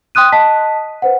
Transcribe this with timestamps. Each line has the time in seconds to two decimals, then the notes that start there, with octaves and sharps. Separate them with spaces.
0.15 G5 C6 D#6 F#6 D#7
0.32 D#5 A5 B6
1.02 B4 C5 F#5